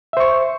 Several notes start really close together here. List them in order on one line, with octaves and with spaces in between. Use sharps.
E5 C5 C#6